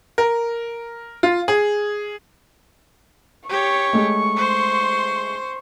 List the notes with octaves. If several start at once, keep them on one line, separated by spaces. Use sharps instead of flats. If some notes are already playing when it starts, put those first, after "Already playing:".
A#4
F4
G#4
G4 C#5 C#6
G#3 A3
C5 C6